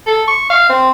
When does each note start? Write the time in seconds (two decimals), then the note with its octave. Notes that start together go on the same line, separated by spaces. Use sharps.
0.07 A4
0.28 C#6
0.50 F5
0.69 C4